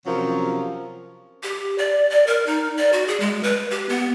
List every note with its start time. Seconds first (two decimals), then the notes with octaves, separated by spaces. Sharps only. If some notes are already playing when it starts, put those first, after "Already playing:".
0.06 C3 F3 F#3 C#4 A#4
1.43 G4
1.78 D5
2.10 D5
2.27 A#4
2.46 D#4
2.78 D5
2.93 F#4
3.08 G#4
3.20 G#3
3.43 B4
3.71 G4
3.89 B3